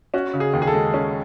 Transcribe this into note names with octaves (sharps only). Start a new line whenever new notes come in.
C#4 F#4
C#3
G#4
D#2
G#4
A4
G#3
C#4